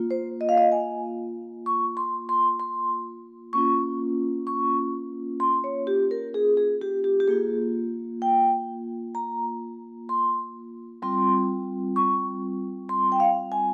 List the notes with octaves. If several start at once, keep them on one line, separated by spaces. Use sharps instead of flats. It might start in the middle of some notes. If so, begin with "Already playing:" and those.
Already playing: A#3 F4
C5
D#5
F5
D#5
G#5
C#6
C6
C6
C6
A#3 C#4 F4 C#6
C#6
C6
C#5
G4
A#4
G#4
G#4
G4
G4
G4
A#3 F4 G#4
G5
A#5
C6
G3 C4 F4 C6
C#6
C6
G5
F5
G#5